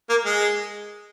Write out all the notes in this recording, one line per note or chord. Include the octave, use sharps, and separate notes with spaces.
A#3
G#3